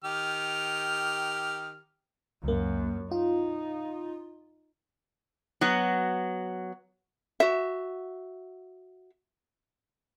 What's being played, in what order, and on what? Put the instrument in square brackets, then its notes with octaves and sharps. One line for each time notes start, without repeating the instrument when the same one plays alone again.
[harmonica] D#3 G4 F6
[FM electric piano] C#2 A#3 [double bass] F#2
[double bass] D#4 [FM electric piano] F4
[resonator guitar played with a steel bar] F#3 B3 F#4
[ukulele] F#4 E5